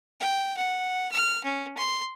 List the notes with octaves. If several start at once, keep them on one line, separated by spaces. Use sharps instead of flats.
G5
F#5
F6
C#4
C6